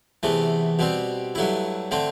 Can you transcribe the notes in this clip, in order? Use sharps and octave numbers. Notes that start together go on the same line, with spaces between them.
E2 C3 E3 A3
B2 G3 C4
G2 F#3 A3 E4
D3 A3 C4